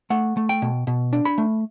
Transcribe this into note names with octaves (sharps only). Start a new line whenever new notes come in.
A3 F#5
A3
G5
B2
B2
D4
B5
A3